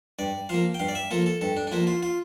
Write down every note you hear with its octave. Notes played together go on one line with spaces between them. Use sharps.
G2 D5
F3 A#3 F5
G5
G2 F5
D5
E5
F3 A#3 A4
A4
G2 A4
D4
D4
F3 A#3 E4
F4
F4